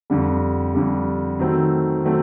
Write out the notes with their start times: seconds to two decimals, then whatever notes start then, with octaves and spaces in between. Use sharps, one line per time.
0.10 F2 D3 G3
0.74 F2 D3 G3
1.39 D#3 F#3 A3 C4
2.04 D#3 F#3 A3 C4